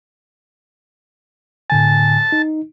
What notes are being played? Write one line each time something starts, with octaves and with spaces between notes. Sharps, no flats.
A2 D3 G#5 A5
D#4